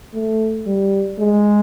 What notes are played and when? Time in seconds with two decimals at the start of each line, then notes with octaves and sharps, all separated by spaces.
0.14 A3
0.66 G3
1.19 G#3